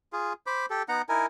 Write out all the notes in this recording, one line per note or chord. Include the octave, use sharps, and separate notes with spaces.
F4 G#4
C5 B5 D6
G4 A4
B3 D#4 F#5 A#5
D#4 E4 A#4 G#5